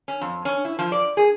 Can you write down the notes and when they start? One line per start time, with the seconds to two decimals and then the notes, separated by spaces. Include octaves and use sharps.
0.08 C#4
0.21 F2
0.45 C#4
0.65 E4
0.79 F3
0.92 D5
1.17 G#4